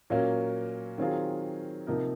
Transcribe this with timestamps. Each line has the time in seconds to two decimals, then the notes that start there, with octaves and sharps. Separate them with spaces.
0.10 A#2 F#3 A#3 C#4
0.98 D#3 F#3 C4 F4 G#4
1.87 C3 F3 A#3 D#4 A#4